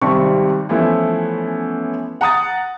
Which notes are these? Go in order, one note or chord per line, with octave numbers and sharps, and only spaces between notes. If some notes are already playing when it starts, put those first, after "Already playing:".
G#1 C3 G3 C4 A5 C#6
E3 F3 A3 B3 C#4 E4
F#5 A#5 D#6 A6